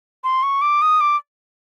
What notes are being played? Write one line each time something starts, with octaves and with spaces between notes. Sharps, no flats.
C6
C#6
D6
D#6
D6